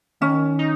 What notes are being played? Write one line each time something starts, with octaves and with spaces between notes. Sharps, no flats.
D#3 C#4
D#4